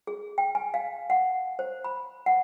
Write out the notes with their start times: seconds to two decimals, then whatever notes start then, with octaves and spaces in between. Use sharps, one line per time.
0.07 G#4
0.38 G5
0.55 G#5
0.74 F5
1.10 F#5
1.59 C5
1.84 B5
2.26 F#5